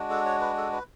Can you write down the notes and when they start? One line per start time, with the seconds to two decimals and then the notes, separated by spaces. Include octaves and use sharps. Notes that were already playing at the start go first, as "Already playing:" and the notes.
Already playing: G#3 D4 F#4
0.10 A4
0.26 C#5
0.41 B4
0.57 A4
0.72 B4